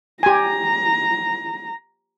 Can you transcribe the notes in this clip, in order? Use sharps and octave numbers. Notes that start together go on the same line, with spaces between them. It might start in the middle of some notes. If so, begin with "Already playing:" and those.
G4 G#5 A#5